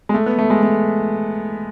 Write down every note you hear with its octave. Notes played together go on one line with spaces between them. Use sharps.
G#3
A3
B3
A3
G#3
A3